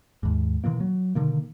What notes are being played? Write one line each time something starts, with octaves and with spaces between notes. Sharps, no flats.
D#2 G#2
B2 D#3 E3 A#3
F#3
B2 D3 D#3 A#3